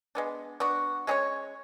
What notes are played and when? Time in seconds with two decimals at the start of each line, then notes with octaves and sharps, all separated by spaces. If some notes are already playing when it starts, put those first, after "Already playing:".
0.15 G#3 B3 D4
0.60 B3 D4 F#4
1.07 G#3 C#4 G#4 C#5